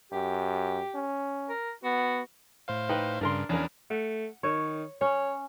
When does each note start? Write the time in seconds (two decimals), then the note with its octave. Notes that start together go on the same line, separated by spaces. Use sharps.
0.12 F#2 G4
0.95 C#4
1.49 A#4
1.84 B3 F#4
2.68 A2 C5 F5
2.89 D#4 B4 G5
3.21 G2 C#3 D4 A#4 C6
3.49 E2 C#4 D4 A#4
3.90 A3 F#5
4.43 D#3 C#5
5.01 C#4 C#5